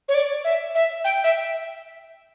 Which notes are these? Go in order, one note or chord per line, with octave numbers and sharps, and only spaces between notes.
C#5
D5
E5
E5
G5
E5